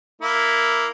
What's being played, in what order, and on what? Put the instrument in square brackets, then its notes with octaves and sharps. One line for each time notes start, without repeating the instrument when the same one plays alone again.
[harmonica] A#3 E4